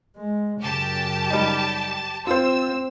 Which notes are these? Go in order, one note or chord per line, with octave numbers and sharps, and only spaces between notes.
G#3
F#2 C#3 G4 A5
G3 D#4
C4 F4 C5 E6